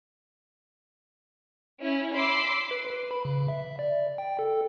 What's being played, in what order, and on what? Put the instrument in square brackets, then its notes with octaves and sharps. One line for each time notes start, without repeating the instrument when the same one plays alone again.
[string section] C#4 E4
B5 C6 D6 E6 C7
[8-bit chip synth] B4
B4
B5
C#3
E5
D5
G5
A4